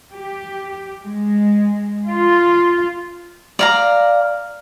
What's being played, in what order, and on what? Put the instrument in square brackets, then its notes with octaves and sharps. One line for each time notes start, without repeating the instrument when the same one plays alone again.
[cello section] G4
G#3
F4
[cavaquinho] D5 F5 A#5